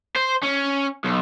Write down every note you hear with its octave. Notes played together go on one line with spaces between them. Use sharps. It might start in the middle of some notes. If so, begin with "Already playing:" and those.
C5
C#4
B1